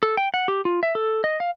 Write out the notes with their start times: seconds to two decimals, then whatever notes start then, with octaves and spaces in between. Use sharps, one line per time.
0.03 A4
0.17 G5
0.34 F#5
0.48 G4
0.65 F4
0.83 E5
0.95 A4
1.24 D#5
1.40 F5